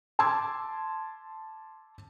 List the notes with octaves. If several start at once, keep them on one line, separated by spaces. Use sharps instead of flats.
A5 C6 D6 E6 G#6